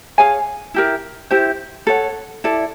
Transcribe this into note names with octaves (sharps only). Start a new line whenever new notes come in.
G#4 C#5 F5 G#5
E4 G4 A#4
E4 G4 C5
A4 C#5 F#5
E4 A4 D5